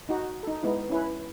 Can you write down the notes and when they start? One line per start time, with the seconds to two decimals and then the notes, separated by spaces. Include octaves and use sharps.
0.09 D#4 F#4
0.43 D#4 A4
0.63 G#3 B3 D#4 E4
0.90 C#4 E4 B4